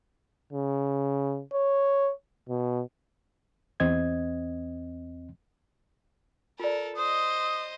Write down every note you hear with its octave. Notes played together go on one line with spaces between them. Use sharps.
C#3
C#5
B2
E2 C4 D#5 G#6
F4 A4 A#4 D5
C5 D#5 D#6